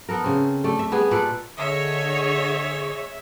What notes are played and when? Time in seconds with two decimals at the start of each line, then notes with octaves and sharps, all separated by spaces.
0.09 B3 A4 A#4
0.24 C#3 C4
0.64 A3 D5 G5
0.79 E5
0.92 G3 B3 G#4
1.11 A#2 A4 B4 D5
1.58 D3 G#4 C#5 D#5 E5